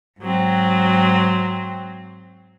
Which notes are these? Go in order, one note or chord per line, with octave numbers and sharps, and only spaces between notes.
G#2 F#3 C4